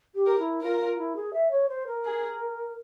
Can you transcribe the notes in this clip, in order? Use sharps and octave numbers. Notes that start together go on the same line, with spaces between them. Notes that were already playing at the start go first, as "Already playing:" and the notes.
G4
A#4
E4
F4 A#4
F4
E4
G#4
E5
C#5
C5
A#4
G#4